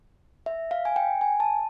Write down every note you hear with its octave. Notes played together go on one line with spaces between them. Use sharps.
E5
F5
G#5
G5
G#5
A5